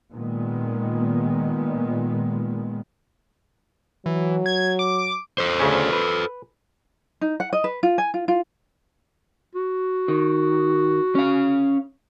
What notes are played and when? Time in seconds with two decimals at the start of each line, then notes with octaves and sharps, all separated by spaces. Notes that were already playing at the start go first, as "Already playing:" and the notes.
0.11 A#2 D#3 G#3 B3
4.06 E3 F#3
4.46 G#6
4.79 D6
5.38 A4 C5
5.60 D2 C#3 C#4
5.93 B4
7.21 D#4
7.40 F#5
7.53 D#5
7.64 B4
7.83 F4
7.98 G#5
8.14 F4
8.28 F4
9.55 F#4
10.08 D#3
11.15 C#4 F5